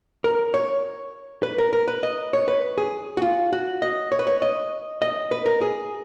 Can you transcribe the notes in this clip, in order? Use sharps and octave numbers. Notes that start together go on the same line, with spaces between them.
A#4
C#5
B4
A#4
A#4
B4
D#5
C#5
B4
G#4
F#4
F4
F#4
D#5
C#5
B4
C#5
D#5
D#5
B4
A#4
G#4